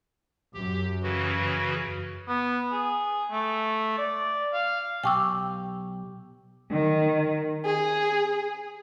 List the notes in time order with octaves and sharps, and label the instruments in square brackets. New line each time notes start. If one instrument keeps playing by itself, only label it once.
[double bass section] F#2 [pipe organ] G4
[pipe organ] C#3 E3 F#4
[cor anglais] B3
G#4
A3
D5
F5
[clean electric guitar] B1 G4 [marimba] G5 C#6 E6
[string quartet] D#3
G#4